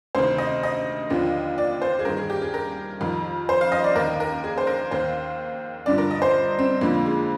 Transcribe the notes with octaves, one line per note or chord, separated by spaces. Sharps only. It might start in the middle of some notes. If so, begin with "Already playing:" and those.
D2 C3 D#3 C5
D#5
D#5
D#2 D3 F3
D5
C5
G#4
G2 D#3 A#4
G#4
G4
G#4
A#4
F2 D#3
C5
F5
D#5
D5
D#2 D#3 A#4
A#4
G#4
C5
A#4
D#2 D#3 C5
G2 D3 F3 D5
A#4
D#5
C5
C4
F2 D3 F3 A#3
G#3